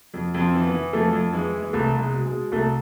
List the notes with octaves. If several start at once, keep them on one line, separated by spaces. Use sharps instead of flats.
F2
F2
C4
E3
B3
E3
F2 A3
F2
E3 G#3
E3
G#3
C2 A3
C2
G#3
B2
G#3
B2
C2 A3